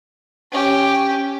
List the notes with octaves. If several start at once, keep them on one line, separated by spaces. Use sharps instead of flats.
C#4 G4